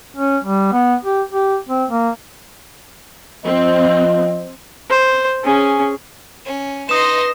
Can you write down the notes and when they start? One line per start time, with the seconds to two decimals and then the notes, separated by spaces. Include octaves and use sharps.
0.17 C#4
0.44 G3
0.72 B3
1.04 G4
1.32 G4
1.69 C4
1.90 A#3
3.45 F3 C4 D#5
4.90 C5
5.44 C#4 G#4
6.45 C#4
6.89 D#4 B4 D#5 C6 D#6 A#6 E7